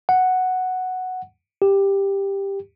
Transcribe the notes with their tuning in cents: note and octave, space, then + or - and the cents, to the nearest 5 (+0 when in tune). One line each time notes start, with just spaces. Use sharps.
F#5 +0
G4 +10